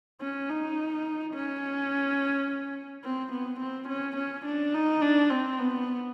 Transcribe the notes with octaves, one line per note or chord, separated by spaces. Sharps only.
C#4
D#4
C#4
C4
B3
C4
C#4
C#4
D4
D#4
D4
C4
B3